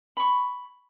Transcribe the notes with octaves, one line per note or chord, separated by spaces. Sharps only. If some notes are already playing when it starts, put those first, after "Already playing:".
B5 C#6